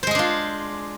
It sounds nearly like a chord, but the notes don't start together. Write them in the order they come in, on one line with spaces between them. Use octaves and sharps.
C5 G#3 G#4 D4 F4